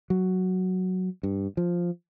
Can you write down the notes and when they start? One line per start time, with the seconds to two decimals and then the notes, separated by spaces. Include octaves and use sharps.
0.10 F#3
1.23 G2
1.57 F3